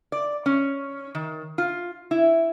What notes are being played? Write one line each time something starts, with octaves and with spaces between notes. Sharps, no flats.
D5
C#4
D#3
F4
E4